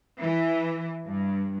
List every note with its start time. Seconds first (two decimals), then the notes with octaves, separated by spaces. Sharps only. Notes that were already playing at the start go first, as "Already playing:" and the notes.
0.21 E3
1.06 G2